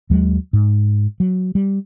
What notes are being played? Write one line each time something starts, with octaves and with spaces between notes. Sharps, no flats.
D#2 F#3 G#3
G#2
F#3
G3